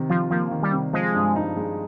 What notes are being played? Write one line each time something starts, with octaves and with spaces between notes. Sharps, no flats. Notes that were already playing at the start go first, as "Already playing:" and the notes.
Already playing: C3 D#3
F3 F4
F3 A#3
D#3
G3
C3
F3 G#3
G2
D#4
G#3